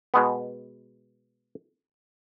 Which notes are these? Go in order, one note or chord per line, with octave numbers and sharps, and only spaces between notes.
B2 G#3 B3